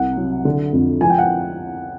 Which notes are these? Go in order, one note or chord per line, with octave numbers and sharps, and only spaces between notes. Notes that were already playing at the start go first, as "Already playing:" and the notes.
Already playing: C2 C3 F#5
F#3
D3
F2
F3 G#5
G5
F#5